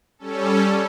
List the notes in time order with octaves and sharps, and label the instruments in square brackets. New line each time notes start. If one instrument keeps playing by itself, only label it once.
[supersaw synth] G3 C#4 A4